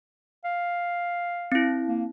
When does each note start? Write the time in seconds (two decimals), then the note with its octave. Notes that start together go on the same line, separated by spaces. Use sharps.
0.45 F5
1.52 C4 E4
1.87 A#3